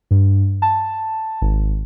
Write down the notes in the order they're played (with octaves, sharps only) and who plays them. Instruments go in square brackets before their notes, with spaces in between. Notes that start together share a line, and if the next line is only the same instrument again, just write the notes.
[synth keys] G2
A5
G#1